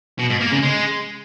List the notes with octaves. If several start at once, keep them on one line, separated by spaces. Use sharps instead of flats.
B2
G#2
A#3
C#3
G#3